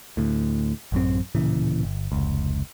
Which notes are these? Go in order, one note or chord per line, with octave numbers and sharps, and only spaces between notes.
D2 A2
A1 F#2 C4
D1 A#2 C#3 E3
G1
F1 C#2